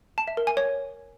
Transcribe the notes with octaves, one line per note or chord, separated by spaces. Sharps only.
A5
E5
A#4
G#5
C#5